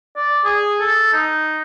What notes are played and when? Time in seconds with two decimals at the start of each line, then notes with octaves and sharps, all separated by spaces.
0.16 D5
0.44 G#4
0.81 A4
1.13 D#4